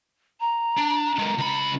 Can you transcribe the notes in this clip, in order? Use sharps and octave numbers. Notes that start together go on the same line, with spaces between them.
A#5
D4
G#3 A#3
C#2 B5